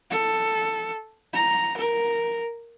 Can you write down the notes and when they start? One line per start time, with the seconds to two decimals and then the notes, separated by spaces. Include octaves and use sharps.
0.10 A4
1.33 A#5
1.77 A#4